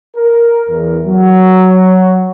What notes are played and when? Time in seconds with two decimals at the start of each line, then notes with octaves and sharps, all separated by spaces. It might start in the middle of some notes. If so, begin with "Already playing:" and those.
0.16 A#4
0.69 E2
1.05 F#3